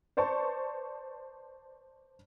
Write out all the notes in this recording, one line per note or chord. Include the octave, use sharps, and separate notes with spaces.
B4 C5 D5 A5 C#6